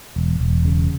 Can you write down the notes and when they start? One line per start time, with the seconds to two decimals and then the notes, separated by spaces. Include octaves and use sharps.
0.16 E1
0.41 E1
0.65 C#3